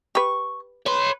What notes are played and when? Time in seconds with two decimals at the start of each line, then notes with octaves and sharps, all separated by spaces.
0.15 G4 B4 C#6
0.86 B4 C#5 C6